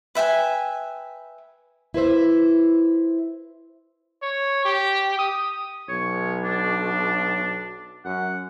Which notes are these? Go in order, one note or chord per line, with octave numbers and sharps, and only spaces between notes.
B4 E5 G5 G#5
E4 B4 C5 E5
C#5
G4
D#6
B1 C#5
D4
F#2 F#5